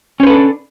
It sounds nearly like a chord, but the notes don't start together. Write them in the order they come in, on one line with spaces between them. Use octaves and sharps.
C#4 C5 B4 A4 D4